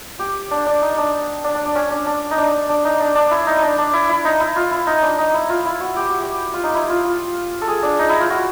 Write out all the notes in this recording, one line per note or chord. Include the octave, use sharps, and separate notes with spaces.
G4
D4
D4
D#4
D4
D4
D4
D4
C#4
D4
D4
D#4
D4
D4
D#4
D4
D4
E4
D#4
D4
D4
E4
E4
D#4
E4
F4
E4
D#4
D4
D#4
E4
F4
E4
F#4
G4
F#4
G4
F4
D#4
E4
F4
F4
A4
G#4
D4
D#4
E4
F4
F#4